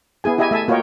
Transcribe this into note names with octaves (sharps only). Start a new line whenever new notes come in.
B3 E4 G#4 G#5
E4 G4 D#5 E5 G#5
A3 E5 G#5 A5
A#3 F4 F#4 C#5 D#5 G5